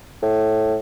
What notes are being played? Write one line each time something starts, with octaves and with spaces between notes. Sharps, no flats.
A2